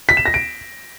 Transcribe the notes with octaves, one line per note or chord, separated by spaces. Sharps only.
B6
E7
A#6
D7